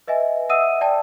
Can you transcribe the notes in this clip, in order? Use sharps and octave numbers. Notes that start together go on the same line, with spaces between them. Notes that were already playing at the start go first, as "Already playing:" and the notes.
B4 D#5 E5 G#5
E5 F#5 D#6 E6 D#7
D5 G5 A5